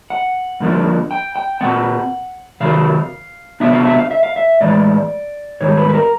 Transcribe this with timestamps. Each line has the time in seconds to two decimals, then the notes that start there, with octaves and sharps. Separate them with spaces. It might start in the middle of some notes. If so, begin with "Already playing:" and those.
0.10 F#5
0.60 G2 D3 F3 A#3 D4
1.11 G5
1.36 G5
1.61 A#2 G3 C4 F#5
2.60 C3 D#3 F#3 F5
3.60 C3 D#3 F#3 B3 D4 E5
3.73 F5
3.85 E5
3.98 F5
4.11 E5
4.23 F5
4.36 E5
4.61 A2 E3 G#3 D5
5.61 G#2 D#3 G3 C#5
5.77 B4
5.89 B4
5.94 A#4